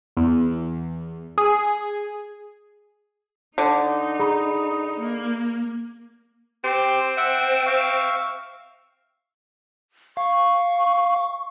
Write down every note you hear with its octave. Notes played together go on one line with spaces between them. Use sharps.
E2
G#4
D3 D#4 D6
G#4 A#5 B5
A#3
C4 G4 C6
E5 F#5
E5 F5 C#6
F5 C#6